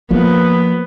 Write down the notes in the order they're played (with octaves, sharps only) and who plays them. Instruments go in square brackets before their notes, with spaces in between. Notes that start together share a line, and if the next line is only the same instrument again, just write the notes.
[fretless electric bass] F3 A#3 [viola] B3